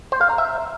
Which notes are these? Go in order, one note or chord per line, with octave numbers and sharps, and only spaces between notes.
C5
F5
A#5
E5